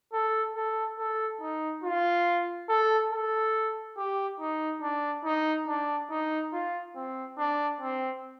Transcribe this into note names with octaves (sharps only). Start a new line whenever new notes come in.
A4
A4
A4
D#4
F4
A4
A4
G4
D#4
D4
D#4
D4
D#4
F4
C4
D4
C4